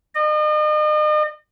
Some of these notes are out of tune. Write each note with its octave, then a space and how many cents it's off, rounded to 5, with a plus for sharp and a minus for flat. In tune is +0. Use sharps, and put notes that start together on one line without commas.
D#5 -40